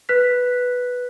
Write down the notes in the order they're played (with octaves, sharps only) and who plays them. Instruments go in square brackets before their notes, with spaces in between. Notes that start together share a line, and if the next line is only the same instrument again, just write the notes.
[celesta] B4 F#6 B6